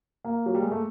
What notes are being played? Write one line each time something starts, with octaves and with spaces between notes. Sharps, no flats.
A#3
F#3
G3
G#3
A3